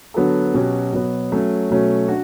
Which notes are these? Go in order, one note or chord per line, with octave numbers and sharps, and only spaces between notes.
D3 F#3 B3 F#4 A4
B2 F#3 C#4 G4
B2 F#3 B3
F#3 A3 C#4
B2 F#3 A3 C#4
D4 F#4